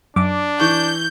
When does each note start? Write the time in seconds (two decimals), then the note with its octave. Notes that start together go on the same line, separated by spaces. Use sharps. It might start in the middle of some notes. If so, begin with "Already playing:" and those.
0.16 F#2 D4 D6
0.60 E3 C#6 G6